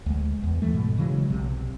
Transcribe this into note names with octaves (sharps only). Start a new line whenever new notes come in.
D2 G#3
E2
E3 G#3 A3
G#2 B2
C#3 E3 F#3 G#3
B1 C3